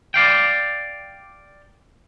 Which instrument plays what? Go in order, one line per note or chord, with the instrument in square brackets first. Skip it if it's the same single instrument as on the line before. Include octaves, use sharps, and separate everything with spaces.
[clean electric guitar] D5 F5 G5